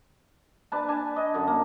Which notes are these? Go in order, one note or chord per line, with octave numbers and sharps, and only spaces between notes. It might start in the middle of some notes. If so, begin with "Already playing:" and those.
D4 B4 A5
D4 G#5 A5
D#5
F#2 D3
A#3